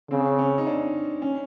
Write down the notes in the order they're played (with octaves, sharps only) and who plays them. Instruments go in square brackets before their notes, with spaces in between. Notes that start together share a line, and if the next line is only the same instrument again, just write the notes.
[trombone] C#3 [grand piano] C4
[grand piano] C#4
D#4
D4
C#4